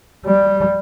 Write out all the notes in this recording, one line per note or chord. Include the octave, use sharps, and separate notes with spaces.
G3